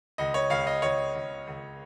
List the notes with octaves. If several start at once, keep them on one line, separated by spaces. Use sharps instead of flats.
C#2 D#5
C#5
C#2 F5
D#5
C#2 C#5
C#2
C#2